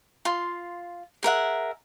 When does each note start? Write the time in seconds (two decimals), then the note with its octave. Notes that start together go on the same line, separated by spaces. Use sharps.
0.25 F4 C6
1.23 G#4 A#4 E5 F#5